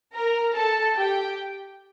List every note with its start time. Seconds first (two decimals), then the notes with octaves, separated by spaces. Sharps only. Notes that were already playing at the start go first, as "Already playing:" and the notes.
0.13 A#4 A#5
0.54 A4 A5
0.96 G4 G5